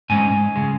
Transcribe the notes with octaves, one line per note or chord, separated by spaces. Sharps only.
G#2 G#3 C#4 G#5
C#3 G#3